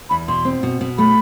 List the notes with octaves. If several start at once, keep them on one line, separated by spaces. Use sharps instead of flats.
E2 B5
B2 C6
C4
B2
B2
A3 B5